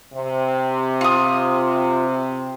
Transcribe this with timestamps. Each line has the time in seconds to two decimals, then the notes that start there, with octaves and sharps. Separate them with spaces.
0.14 C3
1.01 F4 D#6